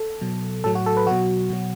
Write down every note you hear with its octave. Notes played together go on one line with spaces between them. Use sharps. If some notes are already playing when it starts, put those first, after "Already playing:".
Already playing: A4
B2 F#3
A2 F#3 A4
F#4
A4
B4
B2 F#3 F#4
B2 F#3